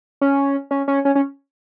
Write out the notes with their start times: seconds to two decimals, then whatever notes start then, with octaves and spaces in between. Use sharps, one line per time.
0.21 C#4
0.71 C#4
0.88 C#4
1.05 C#4
1.15 C#4